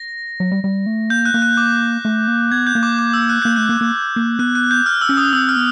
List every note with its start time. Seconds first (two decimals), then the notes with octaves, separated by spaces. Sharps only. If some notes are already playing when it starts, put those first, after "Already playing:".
Already playing: A#6
0.40 F#3
0.52 G3
0.64 G3
0.86 A3
1.10 A#3 G6
1.25 F#6
1.34 A#3
1.42 F#6
1.57 D6
2.05 A3
2.28 A#3
2.51 B3 G#6
2.67 G6
2.75 A#3
2.83 D6
2.99 D6
3.13 E6
3.29 F#6
3.42 A#3 G6
3.56 A3 F#6
3.69 A#3
3.81 A#3
4.16 A#3
4.39 B3 F#6
4.55 F#6
4.71 G6
4.86 F6
5.01 E6
5.09 C#4
5.17 D#6
5.33 C4 E6
5.49 F6
5.56 B3